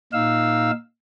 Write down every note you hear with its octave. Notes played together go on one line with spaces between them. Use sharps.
A#2 D#4 F5 E6